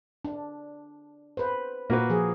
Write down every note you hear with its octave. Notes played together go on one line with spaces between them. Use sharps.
D4
B4 C5
A#2 A#3 F#4 B4
F3 G#4